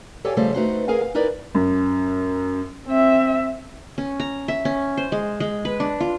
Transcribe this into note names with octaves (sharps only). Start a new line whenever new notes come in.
G4 A4 C#5 D5 F5 G#5
C#3 F3 G3 A3 A4 C5
A3 D#4 F#4 B4 C5
G#4 A#4 F5 G#5
F5
D#4 E4 A#4 B4 D5
F#2
C4 E5
C#4
A#5
E5
C#4
C5
G#3
G#3
B4
D4
F4